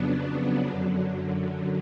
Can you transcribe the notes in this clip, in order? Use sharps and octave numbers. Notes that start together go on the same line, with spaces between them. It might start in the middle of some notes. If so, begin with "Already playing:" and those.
Already playing: F2 C#3 F#3 B3 D4
F#2 D3 F#3